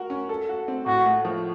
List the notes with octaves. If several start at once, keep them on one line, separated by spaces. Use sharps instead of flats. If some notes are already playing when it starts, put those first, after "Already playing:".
Already playing: F#4 A#4
C#4
A4
F#4
C4
A2 F#4
A3
F3